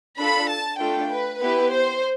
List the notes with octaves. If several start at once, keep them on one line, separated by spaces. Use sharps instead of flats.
D4 F4 A4 B5
A5
A3 D4 F4 A4 G5
B4
B3 E4 G4 B4
C5